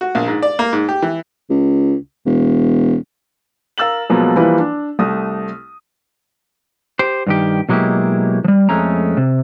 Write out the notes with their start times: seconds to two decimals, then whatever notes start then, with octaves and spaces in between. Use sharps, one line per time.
0.01 F#4
0.15 A#1
0.28 G#2
0.42 D5
0.59 A#3
0.73 G#2
0.89 G4
1.02 E3
1.50 C#2
2.26 E1
3.78 A#4 F5 E6 A6 F#7
4.09 B2 F3 F#3 G#3 A#3 B3
4.36 E3 F3 G3 A#3 E4 B4
4.59 D4
4.99 C2 A3 D#6
6.99 G4 C5
7.27 G2 D#3 G4
7.69 B2 F#3 G#3 A#3 E4 G4
8.44 F3 G3
8.69 F2 G#3 A3 C#4 A#5
9.17 C3